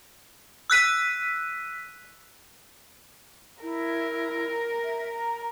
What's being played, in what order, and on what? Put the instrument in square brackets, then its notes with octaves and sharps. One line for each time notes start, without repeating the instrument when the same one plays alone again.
[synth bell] E6 F#6 B6 D#7
[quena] E4 [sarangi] A#4
[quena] E5
A#5